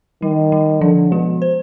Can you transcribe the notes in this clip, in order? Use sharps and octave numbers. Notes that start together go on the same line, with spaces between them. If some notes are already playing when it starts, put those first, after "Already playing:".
D#3 G3
G3
D3 F3
B2 G#3
C5